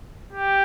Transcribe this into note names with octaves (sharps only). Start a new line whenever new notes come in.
G4